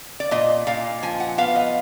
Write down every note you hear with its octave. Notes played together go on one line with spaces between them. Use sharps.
D5
A#2 D#5
A#2 F5
F3 G#5
F#5
B3 F5
D#5